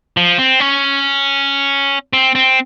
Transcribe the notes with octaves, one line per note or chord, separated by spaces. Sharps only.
F3
C4
C#4
C4
C4